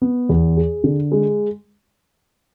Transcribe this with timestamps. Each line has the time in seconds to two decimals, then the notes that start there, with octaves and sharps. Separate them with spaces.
0.02 B3
0.29 E2
0.57 G#4
0.84 D3
1.12 G#3